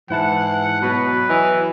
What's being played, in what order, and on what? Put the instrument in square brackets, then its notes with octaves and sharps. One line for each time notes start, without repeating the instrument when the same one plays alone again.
[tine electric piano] G#2 E4 A5 [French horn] E3 [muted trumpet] F#5
[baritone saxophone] B2 [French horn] F#3 [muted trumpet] B4
[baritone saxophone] E3 [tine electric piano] D#5